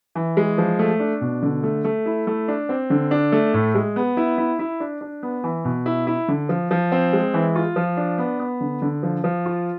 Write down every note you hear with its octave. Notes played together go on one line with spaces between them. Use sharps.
E3
G#3
F3
A3
D4
B2
D3
A3
A3
E4
A3
D4
C4
D3
D4
A3
A2
G#3
B3
E4
E4
E4
D4
D4
B3
E3
B2
E4
E4
D3
F3
F3
C4
G#3
E3
F4
F3
D4
B3
B3
D3
D3
F3
F3
F4